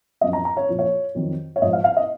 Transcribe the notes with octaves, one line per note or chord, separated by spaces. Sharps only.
F#2 F3 D#5
A#5
A#5
C#5
A#2 F3
C#5
F2 D#3 F#3
C#5
G#2 F3 D#5
F5
F5
D#5